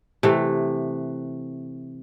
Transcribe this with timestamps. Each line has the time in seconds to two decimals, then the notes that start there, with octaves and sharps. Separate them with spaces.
0.23 C3 E3 A3